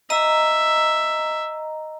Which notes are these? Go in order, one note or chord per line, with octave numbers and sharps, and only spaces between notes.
D#5 E5 A#5